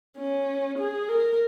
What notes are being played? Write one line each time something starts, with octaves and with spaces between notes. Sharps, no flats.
C#4
G#4
A#4